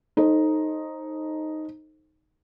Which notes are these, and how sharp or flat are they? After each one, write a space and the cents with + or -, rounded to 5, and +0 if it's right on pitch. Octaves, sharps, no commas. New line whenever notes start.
D#4 +0 A4 +0 C5 +25